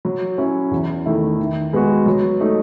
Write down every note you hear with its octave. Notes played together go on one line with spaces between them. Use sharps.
F#3
C#4 E4
E2
D#3 A3 E4
D#3
G#3 B3 F#4
F#3
A3 D#4